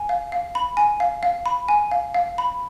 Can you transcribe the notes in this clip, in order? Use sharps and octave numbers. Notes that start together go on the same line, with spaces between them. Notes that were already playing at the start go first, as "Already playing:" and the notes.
Already playing: G#5
F5
F5
B5
G#5
F5
F5
B5
G#5
F5
F5
B5